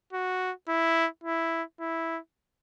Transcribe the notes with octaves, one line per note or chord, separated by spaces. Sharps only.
F#4
E4
E4
E4